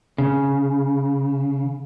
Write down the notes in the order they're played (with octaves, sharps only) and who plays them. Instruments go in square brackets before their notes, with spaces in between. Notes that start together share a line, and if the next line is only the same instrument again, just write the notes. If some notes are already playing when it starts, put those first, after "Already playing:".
[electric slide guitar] C#3